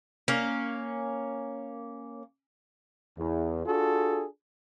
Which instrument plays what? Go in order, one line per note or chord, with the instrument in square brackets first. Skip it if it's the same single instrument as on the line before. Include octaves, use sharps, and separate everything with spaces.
[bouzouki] A#3 C#4
[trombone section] E2
D4 F4 F#4 G#4 A4